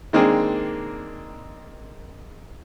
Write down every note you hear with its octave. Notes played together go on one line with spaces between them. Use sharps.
D#3 G#3 A#3 C4 D4 G#4